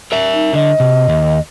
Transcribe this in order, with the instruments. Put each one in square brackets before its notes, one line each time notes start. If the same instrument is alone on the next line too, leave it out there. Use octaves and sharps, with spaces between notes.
[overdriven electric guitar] A#4 E5
[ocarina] D#4
[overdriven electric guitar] D3 [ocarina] D#5
[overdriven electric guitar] C3
D#2